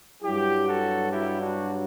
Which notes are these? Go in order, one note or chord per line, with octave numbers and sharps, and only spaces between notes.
G2 F#3 E4 G4
F#4 A4
E4 G4
D4 F#4